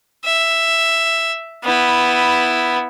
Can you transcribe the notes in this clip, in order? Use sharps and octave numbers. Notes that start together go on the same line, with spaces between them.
E5
B3 E4